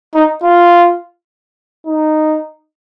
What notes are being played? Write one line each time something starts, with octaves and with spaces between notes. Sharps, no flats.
D#4
F4
D#4